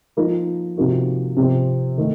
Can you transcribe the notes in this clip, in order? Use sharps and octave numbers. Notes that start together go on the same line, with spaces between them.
F3 A#3 D#4 A#4
C3 F3 A#3 D#4 F#4
C3 F3 C4
D#3 A3